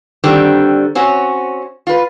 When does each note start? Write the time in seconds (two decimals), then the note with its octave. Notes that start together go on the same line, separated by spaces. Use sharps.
0.24 D3 D#3 G3 C4
0.95 C4 C#4 F#4 C#5
1.87 F4 B4